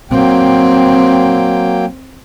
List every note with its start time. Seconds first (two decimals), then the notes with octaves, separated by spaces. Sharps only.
0.11 F#3 A#3 C4 G5